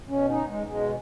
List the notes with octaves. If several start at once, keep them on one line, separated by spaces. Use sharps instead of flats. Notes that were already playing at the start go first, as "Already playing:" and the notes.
B2 C#4
D#4
G#3
B2 G#3